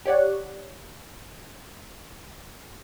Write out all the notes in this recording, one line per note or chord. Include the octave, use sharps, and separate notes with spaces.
G4 C#5 D5 F#5